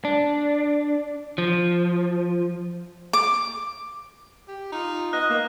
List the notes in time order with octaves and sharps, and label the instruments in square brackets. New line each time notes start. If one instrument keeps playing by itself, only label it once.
[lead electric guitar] D4
F3
[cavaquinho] D6
[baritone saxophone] G4
[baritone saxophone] D#4 [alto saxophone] F4
[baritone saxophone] B3 [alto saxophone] D#5 [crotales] F#6
[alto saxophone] A#3 [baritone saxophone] B3